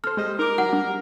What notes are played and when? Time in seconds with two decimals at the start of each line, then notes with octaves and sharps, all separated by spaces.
0.04 A4 C5 F6
0.17 G3 G#3 C5 D#5
0.39 D#4 A#4 D6
0.58 F#3 F#5
0.73 G3 D4